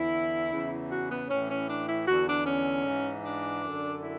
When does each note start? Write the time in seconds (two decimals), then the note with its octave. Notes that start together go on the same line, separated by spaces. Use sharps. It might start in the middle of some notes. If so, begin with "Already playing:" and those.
Already playing: E2 D3 E4
0.51 E2 C#3 E3
0.89 F#4
1.09 B3
1.29 A2 E3 C#4
1.49 C#4
1.68 D4
1.88 E4
2.07 E2 D3 F#4
2.27 D4
2.46 C#4
2.85 G#2 E3
3.25 D4
3.63 F#2 D3
4.02 E4